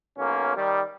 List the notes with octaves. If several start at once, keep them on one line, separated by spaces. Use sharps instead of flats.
B1 A#3 C#4
D#3 G3